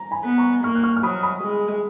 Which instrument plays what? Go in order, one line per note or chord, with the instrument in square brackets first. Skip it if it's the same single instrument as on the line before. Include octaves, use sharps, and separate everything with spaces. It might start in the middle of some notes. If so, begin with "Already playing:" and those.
Already playing: [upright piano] A#5
G#5 B5
[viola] B3
[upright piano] A#5 C#6
[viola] A#3 [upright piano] C#6 F6
[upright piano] F#6
C#6 F6
F6
[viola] F#3 [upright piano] B5 D#6
[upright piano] B5 D#6
[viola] G#3